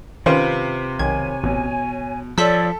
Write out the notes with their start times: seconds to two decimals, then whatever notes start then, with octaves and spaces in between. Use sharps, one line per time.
0.26 C3 D#3 C#4 F4 B4 C5
0.99 B1 D#3 C#5 G#5 G#6
1.43 A1 B2
2.38 F3 A4 C#5 D5 E6 B6